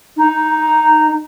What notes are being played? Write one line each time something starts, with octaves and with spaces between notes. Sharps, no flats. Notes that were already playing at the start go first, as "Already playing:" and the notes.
D#4